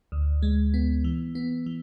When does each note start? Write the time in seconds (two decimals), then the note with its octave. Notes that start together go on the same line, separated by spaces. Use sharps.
0.12 D2
0.43 G#3
0.74 B3
1.04 E3
1.35 B3
1.66 E3